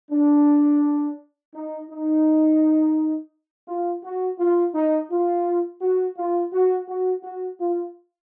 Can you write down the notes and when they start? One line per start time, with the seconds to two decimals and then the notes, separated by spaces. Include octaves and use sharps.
0.11 D4
1.54 D#4
1.90 D#4
3.68 F4
4.04 F#4
4.39 F4
4.75 D#4
5.11 F4
5.82 F#4
6.17 F4
6.53 F#4
6.88 F#4
7.24 F#4
7.59 F4